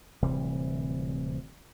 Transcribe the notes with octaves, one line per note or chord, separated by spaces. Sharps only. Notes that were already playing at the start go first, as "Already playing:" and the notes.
D1 C3 E3 G3